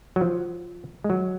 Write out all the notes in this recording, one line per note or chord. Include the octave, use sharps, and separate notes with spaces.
F#3
F3
G#3
F#3